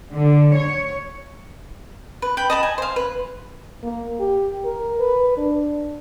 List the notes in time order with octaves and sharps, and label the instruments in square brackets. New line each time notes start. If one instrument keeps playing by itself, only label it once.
[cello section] D3
C#5
[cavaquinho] B4
G5 B5
D#5 A5 B5
G#5
C5 F5
B4
[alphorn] A#3
G4
A#4
B4
D4